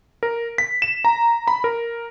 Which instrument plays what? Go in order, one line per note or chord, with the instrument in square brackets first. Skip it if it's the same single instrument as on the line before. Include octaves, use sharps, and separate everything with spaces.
[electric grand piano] A#4
B6
E7
A#5
B5
A#4